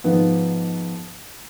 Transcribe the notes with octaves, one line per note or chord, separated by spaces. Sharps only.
G#2 F3 B3